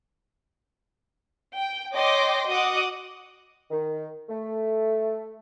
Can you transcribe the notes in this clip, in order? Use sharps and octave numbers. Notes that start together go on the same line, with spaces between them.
G5
C#5 D#5 G5 C6 D6 A#6
F#4 D#5 F#5 D6 D#6
D#3
A3